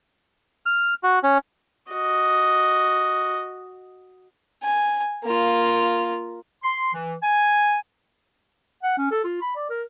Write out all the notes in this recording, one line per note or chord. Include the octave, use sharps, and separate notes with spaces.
F6
F#4
C#4
F#4 D#5
G#5
A#3 F4
C6
E3
G#5
F#5
C#4
A4
F4
B5
D5
A#4